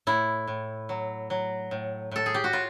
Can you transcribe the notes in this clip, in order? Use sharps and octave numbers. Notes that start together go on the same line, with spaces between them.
A2 E4
A2
F#3
F#3
A2
A2 A4
G#4
G4
F#4
A2 F4